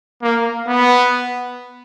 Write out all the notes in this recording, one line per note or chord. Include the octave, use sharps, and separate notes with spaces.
A#3
B3